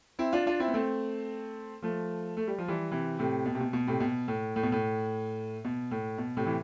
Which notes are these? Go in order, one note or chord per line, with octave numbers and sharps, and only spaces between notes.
C4 E4
D4 F4
D4 F4
C4 E4
B3
A3 C4
F3 A3
A3
G3
F3
E3 G3
C3 E3
A2 C3
B2
C3
B2
B2
A2 C3
B2
A2
A2
B2
A2
B2
A2
B2
A2 C3
E3